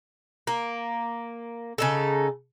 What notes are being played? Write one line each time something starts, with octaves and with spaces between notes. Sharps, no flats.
A#3
C#3 D#4 A4